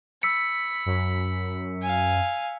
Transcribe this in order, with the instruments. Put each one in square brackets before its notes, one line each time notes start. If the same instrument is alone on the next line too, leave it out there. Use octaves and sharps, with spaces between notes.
[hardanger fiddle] B5 [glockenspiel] E6 B6 C#7
[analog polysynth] F#2
[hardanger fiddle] F5 G#5